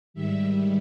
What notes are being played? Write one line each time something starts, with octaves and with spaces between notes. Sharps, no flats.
G#2 D#3 G3 E5